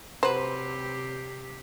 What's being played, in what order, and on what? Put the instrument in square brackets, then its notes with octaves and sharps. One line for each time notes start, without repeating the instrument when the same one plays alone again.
[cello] C3 G4 [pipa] F#3 B4 [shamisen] C5